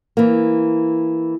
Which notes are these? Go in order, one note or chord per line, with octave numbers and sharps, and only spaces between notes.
E3 A#3